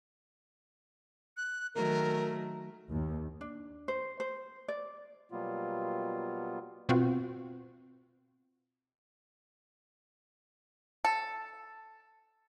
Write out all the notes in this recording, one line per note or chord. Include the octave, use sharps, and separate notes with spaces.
F#6
D#3 F#3 A3 A#4
D#2
D4
C5
C5
D5
B2 F#3 G3 A#3 B3 F4
B2 C4 F4 F#4
A4